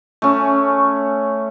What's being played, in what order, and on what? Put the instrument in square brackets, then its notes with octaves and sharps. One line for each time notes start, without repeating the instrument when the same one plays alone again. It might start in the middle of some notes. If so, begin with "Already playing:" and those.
[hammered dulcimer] A3 C#4